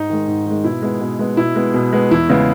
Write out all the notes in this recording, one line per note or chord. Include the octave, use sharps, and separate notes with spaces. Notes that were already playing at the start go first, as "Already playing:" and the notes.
Already playing: G#2 D#4
D#3 G#3
G#2
D#3 G#3
B2 E4
G#3 B3
B2
G#3 B3
B2 E4
G#3 B3
B2
G#3 B3
E2 E4
C#3 G#3 B3